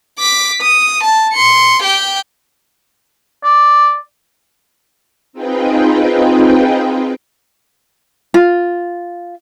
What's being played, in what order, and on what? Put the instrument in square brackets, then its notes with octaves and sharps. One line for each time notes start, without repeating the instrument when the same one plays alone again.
[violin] D6 B6
D#6
A5
C6 C#7
G4 G5
[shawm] D5
[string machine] C4 D#4 F4 G#4 B4 G5
[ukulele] F4